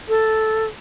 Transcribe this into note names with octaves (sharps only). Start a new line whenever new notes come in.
A4